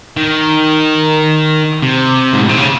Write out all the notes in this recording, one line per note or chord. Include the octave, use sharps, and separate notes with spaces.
D#3
C3
G#2
A2
C3
C#3